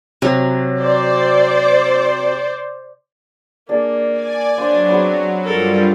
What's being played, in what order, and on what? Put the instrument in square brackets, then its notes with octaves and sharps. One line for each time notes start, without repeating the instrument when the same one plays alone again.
[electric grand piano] C3 [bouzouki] F#3
[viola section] C5 D5
[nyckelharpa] A#3 [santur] D4 G#4
[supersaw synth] D5 G#5
[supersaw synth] F#3 [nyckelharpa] D4 [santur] C5 F5
[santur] B3 C4 G#4
[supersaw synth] G2 G3 F4 [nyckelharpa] A4 A#4